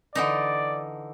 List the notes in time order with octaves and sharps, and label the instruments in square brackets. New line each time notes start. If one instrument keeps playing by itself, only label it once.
[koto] D3 E3 D#4 [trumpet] D5